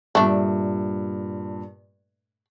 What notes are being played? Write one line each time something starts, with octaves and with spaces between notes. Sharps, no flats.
G2 A#2 A3 D4